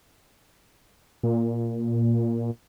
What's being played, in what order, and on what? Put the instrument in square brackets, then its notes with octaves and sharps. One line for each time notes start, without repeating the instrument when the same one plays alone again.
[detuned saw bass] A#2